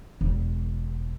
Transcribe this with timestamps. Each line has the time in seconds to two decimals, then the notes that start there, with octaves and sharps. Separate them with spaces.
0.21 E1